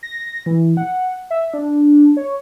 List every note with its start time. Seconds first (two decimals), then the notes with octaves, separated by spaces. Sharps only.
0.03 A#6
0.46 E3
0.77 F#5
1.31 E5
1.54 D4
2.17 C#5